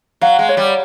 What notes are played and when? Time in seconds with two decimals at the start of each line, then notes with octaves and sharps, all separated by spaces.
0.21 F#3 F5
0.39 G#3
0.49 C#5
0.57 G3